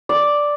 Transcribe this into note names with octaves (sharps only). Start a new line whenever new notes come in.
D5